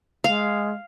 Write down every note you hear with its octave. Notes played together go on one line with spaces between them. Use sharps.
G#3 F5